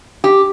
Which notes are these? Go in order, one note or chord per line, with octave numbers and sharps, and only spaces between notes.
G4